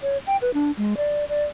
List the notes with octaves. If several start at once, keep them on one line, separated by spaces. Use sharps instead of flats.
C#5
G5
B4
D4
G#3
D5
D5